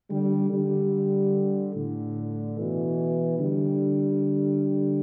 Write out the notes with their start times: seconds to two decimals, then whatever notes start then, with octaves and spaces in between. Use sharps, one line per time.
0.10 D3 G3
0.51 D3 G3
1.74 A2 D3
2.56 B2 E3
3.39 D3 G3